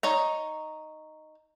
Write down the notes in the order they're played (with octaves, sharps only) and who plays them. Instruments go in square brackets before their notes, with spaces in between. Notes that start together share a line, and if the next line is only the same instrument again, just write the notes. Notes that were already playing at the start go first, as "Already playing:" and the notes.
[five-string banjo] D#4 C#5 A#5